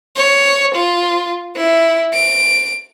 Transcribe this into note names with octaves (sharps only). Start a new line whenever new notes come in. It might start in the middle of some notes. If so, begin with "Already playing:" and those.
C#5
F4
E4
D7